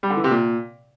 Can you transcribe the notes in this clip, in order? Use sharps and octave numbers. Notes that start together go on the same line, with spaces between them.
G3
D3
E3
C3
A#2